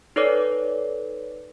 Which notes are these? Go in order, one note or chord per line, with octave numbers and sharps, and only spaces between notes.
D#4 A4 B4 C#5 D5 D6